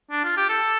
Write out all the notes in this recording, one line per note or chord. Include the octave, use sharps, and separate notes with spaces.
D4
F4
G4
A4